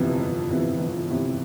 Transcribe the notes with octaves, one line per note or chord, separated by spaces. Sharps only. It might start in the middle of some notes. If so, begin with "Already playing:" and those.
Already playing: G1 F2 C3 E3 B3
G1
F2 C3 E3 B3
G1
F2 C3 E3 B3